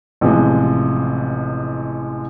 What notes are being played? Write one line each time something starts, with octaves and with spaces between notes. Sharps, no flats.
A1 C3 F3 G#3